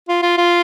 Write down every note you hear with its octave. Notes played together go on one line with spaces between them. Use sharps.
F4
F4
F4